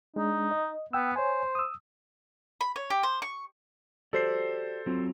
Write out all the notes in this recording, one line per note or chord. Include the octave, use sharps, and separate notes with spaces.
G#3 D4 D#4
D#5
B3 G5 E6
C5 C#5 G#5
D#6 E6
B5
C#5
G4
C5
C#6
F#4 G4 A4 C5 D5 C7
F#3 C4 F4